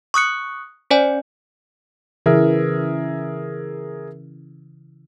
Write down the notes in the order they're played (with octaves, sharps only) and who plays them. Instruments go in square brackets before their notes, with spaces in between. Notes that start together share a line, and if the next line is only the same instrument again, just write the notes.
[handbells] C#6 D#6 F#6 C#7
C#4 C5 D5 G#5
[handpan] C#3 E3 [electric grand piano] G#4 A#4 E5